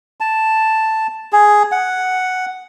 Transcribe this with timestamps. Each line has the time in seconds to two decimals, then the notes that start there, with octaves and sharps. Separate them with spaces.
0.20 A5
1.33 G#4
1.72 F#5